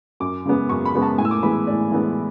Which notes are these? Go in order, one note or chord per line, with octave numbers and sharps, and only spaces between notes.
F#2 D6
C#3 G#3 B3
F#2 C#6
B5
C#3 G#3 B3
A5
A2 G#5
E6
D6
E3 G#3 B3 B5
A2 D5
E3 G#3 B3